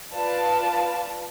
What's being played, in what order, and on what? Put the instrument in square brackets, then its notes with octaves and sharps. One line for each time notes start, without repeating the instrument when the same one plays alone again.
[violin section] F4 B4 D5 F5 A5